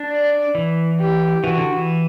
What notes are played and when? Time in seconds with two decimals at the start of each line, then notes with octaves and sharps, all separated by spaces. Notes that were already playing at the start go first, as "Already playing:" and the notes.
Already playing: D4
0.12 D5
0.55 E3
0.99 G4
1.44 E3 F#4
1.58 D3
1.73 E3